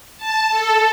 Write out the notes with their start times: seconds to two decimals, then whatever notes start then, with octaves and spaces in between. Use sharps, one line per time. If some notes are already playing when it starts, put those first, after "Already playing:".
0.17 A5
0.50 A4